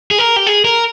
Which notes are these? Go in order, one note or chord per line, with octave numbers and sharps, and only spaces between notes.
G#4
A#4
G4
G#4
A#4